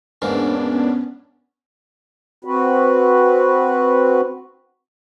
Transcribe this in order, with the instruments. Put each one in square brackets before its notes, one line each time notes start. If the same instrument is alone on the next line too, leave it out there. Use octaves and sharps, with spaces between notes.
[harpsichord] E2 G#2 A#3 [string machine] B3 C#4 [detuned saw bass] D4
[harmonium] C4 F#4 B4